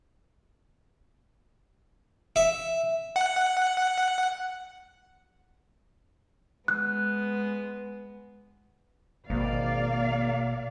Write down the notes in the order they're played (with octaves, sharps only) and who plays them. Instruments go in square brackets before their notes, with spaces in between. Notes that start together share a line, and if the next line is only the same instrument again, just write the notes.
[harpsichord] E5
[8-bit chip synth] F#5
[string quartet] G#3 B3 [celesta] F#6
[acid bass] G#1 [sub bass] B2 [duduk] A#3 [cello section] D5 F5